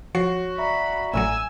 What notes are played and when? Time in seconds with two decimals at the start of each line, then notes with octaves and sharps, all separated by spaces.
0.15 F3 F#4 C#5 C7
0.58 D5 E5 A#5 B5
1.14 A1 A2 F#3 G#5 E6